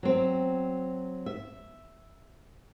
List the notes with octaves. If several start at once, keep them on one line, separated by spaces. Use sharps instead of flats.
F#3 C4
E5